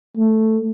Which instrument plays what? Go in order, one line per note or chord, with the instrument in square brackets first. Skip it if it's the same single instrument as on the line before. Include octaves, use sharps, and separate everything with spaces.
[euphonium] A3